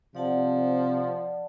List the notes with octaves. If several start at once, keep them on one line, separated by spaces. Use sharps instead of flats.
C3 F3 D5 F#5 A5